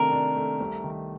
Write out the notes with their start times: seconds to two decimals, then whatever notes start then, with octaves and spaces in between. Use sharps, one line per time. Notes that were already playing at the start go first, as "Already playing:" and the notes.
Already playing: C3 D#3 A3 D4 A#4
0.12 D4
0.36 A3
0.61 C2
0.84 D#3